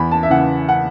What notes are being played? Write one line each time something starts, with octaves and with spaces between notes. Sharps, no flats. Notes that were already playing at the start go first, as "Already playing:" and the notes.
Already playing: E2 B5
A5
E5
C#3 E3 F#5
F#5